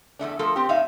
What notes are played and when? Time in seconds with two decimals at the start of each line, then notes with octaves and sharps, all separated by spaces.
0.19 E2 G#2 A3 D4
0.39 F3 A3 F4 A4 A#4
0.56 C4 G4
0.69 A2 D#4 E5 F5